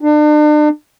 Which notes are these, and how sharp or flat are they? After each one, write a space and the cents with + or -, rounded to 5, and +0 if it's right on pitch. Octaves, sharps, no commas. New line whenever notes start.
D4 +40